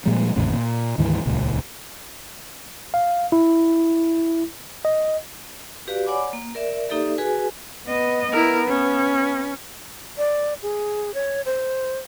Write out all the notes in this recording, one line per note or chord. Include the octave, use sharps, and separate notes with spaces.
A#2 F3 G3 G#3
G#1 E2 A2 C#3
A#2
D2 G#2 D#3 E3
D#1 C#2 A#2
F5
E4
D#5
F#4 G4 B4 D5 F5
C#5 D5 F#5 G#5 B5 D6
A#3
A#4 D5 E5
A#3 D#4 G4 A4 D5 E5
F#4 G#4 B4 G#5
B3 D#5
B3 E4 A#4
C#4
D5
G#4
C#5
C5